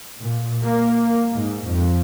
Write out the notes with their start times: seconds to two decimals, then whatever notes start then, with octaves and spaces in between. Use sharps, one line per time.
0.19 A#2
0.62 A#3
1.34 G#2
1.67 F2